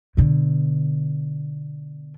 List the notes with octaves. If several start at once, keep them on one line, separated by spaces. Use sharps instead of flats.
B2 D3